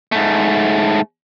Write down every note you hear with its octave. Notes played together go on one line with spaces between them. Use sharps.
G#2 A3